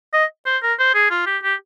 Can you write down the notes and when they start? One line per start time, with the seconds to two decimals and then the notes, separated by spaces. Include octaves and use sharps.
0.14 D#5
0.46 C5
0.63 A#4
0.79 C5
0.95 G#4
1.11 F4
1.26 G4
1.43 G4